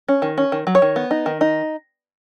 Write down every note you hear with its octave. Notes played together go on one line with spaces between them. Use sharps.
C#4
D#3
C#4
D#3
F#3
C#5
D#3
B3
D#4
D#3
D#4